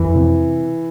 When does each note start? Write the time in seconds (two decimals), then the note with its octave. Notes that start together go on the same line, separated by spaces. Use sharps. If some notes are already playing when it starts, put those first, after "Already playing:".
Already playing: F2 E3
0.15 C3